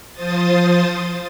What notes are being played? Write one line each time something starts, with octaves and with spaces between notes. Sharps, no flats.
F3 C5 D#6 A6